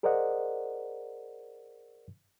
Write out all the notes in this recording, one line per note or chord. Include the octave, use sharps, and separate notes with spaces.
G#4 A#4 C5 D5 D#5 F#5